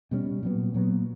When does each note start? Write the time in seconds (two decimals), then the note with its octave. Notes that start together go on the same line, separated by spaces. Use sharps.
0.11 B2 G3 A#3 C#4
0.43 A#2 F#3 B3
0.74 A#2 F#3 B3